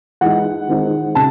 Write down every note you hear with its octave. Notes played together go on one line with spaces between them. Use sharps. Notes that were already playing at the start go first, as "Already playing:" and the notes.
E3 G#3 D#4 F#5
D#3 G#3 C4 D#4
C#3 A5